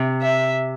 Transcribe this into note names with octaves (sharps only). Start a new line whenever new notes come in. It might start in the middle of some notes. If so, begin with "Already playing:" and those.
Already playing: C3
E5